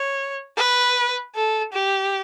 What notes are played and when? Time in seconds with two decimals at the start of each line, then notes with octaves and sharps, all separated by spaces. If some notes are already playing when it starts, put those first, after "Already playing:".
Already playing: C#5
0.57 B4
1.35 A4
1.73 G4